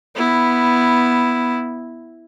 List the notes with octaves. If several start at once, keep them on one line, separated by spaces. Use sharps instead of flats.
B3 E4